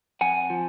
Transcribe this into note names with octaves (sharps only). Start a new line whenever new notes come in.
F2 F#5 G#5
F3